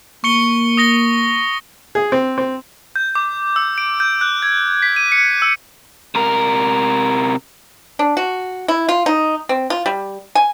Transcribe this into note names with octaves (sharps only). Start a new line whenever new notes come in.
A#3 C#6 C#7 G7
D#6 A#6 G7
G#4
C4
C4
G6
D6
E6
D7
G6
F#6
G#6
B6
D#7
C#7
E6
C3 A#4
D4
F#4
E4
F4
D#4
C4
F4
G3
G#5